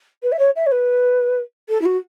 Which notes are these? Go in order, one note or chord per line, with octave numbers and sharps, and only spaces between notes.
B4
E5
C#5
E5
C#5
B4
A4
E4
F#4